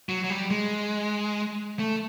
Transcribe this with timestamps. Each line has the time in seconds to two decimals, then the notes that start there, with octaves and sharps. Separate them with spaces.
0.09 F#3
0.24 F#3
0.30 G3
0.51 G#3
1.80 A3